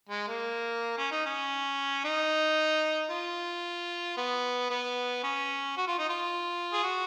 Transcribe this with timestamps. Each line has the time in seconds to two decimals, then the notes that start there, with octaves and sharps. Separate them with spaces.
0.09 G#3
0.28 A#3
0.98 C#4
1.11 D#4
1.26 C#4
2.05 D#4
3.10 F4
4.17 B3
4.71 B3
5.24 C#4
5.77 F#4
5.88 F4
5.99 D#4
6.09 F4
6.73 G#4
6.84 F#4